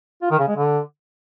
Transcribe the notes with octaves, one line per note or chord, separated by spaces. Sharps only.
F4
D#3
C#3
G#3
D3